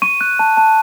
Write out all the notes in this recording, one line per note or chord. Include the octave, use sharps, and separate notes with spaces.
C#6 D#7
F#6
A5
A5